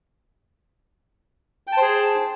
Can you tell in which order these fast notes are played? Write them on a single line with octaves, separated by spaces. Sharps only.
G5 A5 C5 G#4